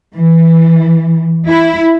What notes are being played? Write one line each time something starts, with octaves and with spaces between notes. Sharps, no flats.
E3
E4